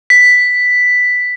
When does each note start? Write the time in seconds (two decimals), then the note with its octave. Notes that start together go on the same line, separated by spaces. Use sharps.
0.10 B6